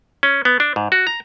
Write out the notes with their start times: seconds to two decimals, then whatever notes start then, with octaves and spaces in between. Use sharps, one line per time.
0.23 C#4
0.45 B3
0.60 D4
0.76 G#2
0.92 F#4
1.07 A#5